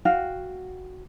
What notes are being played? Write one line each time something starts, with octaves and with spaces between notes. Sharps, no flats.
F#4 F5 G5